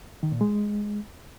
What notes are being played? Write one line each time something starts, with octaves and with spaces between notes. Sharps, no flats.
D#3
A#2
G#3